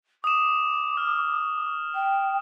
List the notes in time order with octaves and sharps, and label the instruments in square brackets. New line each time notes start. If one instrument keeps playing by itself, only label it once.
[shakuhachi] D6 [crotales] D#6 E7
[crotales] F6
[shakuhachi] G5